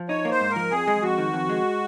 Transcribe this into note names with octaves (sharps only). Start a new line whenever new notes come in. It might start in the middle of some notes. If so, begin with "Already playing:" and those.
Already playing: F3
D#4 C#5
A#3
C5
G#2
A#4
F3
F2 G#4
G#3
F2 F#4
D#3
F2
G#3